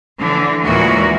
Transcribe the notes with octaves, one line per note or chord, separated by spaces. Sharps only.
D3 E3
D#2 A#2 E3 G#3 F#4 A#4